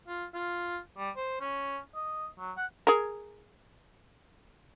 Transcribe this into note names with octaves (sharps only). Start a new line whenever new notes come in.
F4
F4
G3
C5
C#4
D#5
F#3
F#5
G#4 A#4